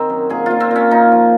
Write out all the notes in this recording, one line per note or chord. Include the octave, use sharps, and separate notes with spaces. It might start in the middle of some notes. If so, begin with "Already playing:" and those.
Already playing: D#3 C4 D#4 G#4
F#2
A#2 G#4
A#2 F4
C4
A#2 C#4
A#2 D#4
F3